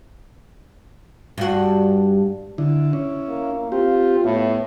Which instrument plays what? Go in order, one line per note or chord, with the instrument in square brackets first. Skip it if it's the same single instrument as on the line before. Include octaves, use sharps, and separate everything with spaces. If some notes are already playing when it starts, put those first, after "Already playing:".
[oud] G2 F#4
[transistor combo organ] D3 E4
C#4 E4
[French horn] A#3
[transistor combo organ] C4 G4 [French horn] F4
[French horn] A2 [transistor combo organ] B3